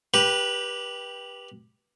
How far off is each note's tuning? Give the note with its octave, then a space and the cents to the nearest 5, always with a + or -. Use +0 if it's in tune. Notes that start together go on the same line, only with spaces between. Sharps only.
G4 +0 B4 -25 B5 +0